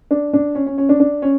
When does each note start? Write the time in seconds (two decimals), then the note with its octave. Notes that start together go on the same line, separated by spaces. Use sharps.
0.11 D4
0.33 D4
0.55 C#4
0.67 C#4
0.78 C#4
0.89 D4
1.00 D4
1.22 C#4